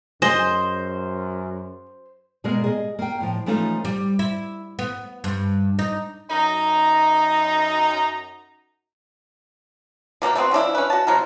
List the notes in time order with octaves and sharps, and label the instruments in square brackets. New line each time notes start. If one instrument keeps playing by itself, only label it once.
[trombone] F#2 [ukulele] G#4 [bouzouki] C5 [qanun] D#5
[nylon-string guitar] B2 G#3 A#3 B3 A#4 D#5
G#4 D#5
A#3 G5
A2 F3
E3 F3 A3 C#4 D#4 F4
[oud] G3
E4
B3
G2
D#4
[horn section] F#2 D#4 A#5
[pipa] B2 A#3 D4 G4
A3 B3 C4 F#4
F3 C#4 D4 E4
C#4 B4
F#4 A5
C3 F#3 E4 A#4